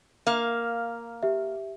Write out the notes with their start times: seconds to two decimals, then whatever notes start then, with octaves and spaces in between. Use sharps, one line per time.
0.27 A#3 F5
1.23 G4 E5